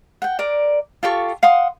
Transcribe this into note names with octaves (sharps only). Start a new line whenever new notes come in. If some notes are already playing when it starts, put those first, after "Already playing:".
F#5 G5
A#4 D5
F4 G4 A4 C#6
F5 F#5 C6 D#6